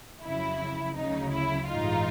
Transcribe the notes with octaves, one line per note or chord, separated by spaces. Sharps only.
F2 C#3 F#3 E4
D2 C#3 F#3 D#4
E4
A1 G2 E3 G#3 D#4 F4